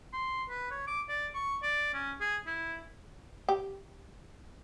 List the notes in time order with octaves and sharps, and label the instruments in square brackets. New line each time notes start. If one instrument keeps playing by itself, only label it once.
[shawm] C6
B4
C#5
D6
D5
C#6
D5
C#4
G#4
E4
[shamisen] G4